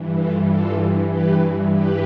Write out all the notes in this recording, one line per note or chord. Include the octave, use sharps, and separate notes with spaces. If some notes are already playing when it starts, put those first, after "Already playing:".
Already playing: G2 E3
F4 A4
F4 A4
G4 B4
G4 B4